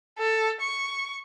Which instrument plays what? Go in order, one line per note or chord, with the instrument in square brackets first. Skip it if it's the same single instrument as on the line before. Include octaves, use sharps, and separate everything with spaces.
[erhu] A4
C#6